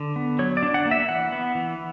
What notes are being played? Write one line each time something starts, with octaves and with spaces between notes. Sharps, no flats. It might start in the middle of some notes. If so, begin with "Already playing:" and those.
Already playing: D3
B3
F#3 C#5
D5
D4
F#5
A#3
E5
E3 F#5
B3
E3